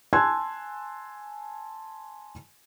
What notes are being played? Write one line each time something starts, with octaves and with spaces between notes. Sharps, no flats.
G#5 A5 C6 E6 F#6 G#6